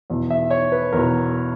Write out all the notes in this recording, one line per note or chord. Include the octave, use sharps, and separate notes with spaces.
E2 B2
E5
C#5
B4
E2 B2 A#4